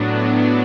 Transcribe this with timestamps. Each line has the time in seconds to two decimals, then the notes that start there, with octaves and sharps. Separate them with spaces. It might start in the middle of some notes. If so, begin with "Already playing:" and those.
Already playing: A2 F#3 B3 D4
0.20 D5